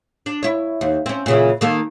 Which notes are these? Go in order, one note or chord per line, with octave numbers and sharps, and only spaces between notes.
D4
E4 C#5
D#2
C4 C#4
A#2 C#3 E3
D#3 A#3 A4